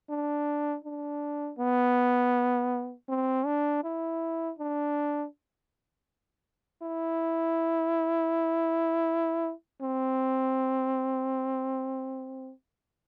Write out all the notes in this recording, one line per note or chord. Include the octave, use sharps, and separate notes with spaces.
D4
D4
B3
C4
D4
E4
D4
E4
C4